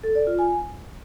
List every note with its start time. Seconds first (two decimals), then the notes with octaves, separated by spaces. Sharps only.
0.04 A4
0.15 D5
0.27 F4
0.39 G#5